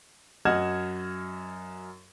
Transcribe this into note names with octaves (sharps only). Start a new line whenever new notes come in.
F#2 D#5 F#5 F6 G#6 E7